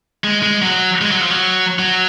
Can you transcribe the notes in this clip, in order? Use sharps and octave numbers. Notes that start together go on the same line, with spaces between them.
G#3
G#3
F#3
G#3
F#3
F3
F#3
F#3